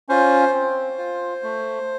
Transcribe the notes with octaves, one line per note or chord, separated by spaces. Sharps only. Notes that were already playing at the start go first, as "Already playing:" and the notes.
C#4 F4 C5
C4
F4
A3